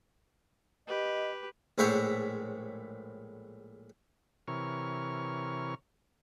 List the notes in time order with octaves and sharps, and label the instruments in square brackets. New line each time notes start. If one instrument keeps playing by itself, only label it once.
[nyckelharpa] G4 B4 [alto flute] D#5
[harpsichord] A#1 A2 G#3 C5 C#5 E5
[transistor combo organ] C3 E3 A#4 C#5 C#6 F6